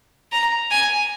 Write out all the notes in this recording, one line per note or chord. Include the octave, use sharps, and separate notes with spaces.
A#5
G#5